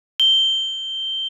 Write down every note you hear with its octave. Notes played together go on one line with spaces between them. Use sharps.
G7